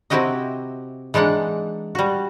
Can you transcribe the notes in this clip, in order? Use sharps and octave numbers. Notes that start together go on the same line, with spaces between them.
C3 C4 E4 F#4 G4 D#5
E3 G#3 D4 D#4 F#5
G3 F#4